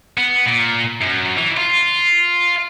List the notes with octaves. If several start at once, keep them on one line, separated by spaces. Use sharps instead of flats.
B3
A#2
F#2
E3
F4